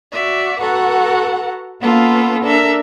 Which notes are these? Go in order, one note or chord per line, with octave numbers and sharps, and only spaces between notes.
F#4 D5 E5
F#4 A4 B4 F#5 A#5
A#3 B3 C#4 F4 A4
D4 A4 A#4 E5